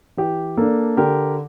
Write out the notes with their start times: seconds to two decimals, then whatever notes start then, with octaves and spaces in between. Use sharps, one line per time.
0.17 E3 G4
0.57 A#3 D4 A4
0.97 D3 G4 A#4